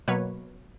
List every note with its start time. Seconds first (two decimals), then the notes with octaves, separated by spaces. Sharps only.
0.08 B2 F#3 A#3 B4 C#5